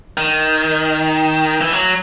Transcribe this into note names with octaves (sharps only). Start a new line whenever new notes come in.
D#3
E3
F#3